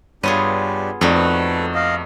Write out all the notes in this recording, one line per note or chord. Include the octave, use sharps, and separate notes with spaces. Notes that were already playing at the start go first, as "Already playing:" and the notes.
G2 B3 D4 F4 G4 G#4 C#5 D#7
F2 A3 D#4 F#4 D5
A4 B4
D#5 F5